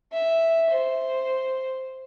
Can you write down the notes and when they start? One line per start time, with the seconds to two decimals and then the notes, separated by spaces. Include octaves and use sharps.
0.13 E5
0.70 C5